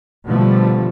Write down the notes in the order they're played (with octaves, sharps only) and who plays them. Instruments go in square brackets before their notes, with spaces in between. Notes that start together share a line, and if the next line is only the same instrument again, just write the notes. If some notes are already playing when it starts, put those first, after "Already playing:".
[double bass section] B2 D3 F3 G3 A3